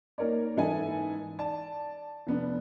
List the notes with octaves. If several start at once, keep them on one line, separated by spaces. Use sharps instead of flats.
A#3 D#4 A#4 C#5 D5
G#2 E3 E4 A4 D#5 G#5
D5 A5
F1 B3 D4